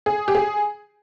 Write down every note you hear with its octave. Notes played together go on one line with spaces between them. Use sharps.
G#4
G4
G#4